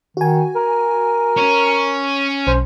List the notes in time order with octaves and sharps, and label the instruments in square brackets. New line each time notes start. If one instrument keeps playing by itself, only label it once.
[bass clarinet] D#3 [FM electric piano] F#4 G#5
[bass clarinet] A#4
[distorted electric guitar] C#4
[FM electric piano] B1 [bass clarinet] C5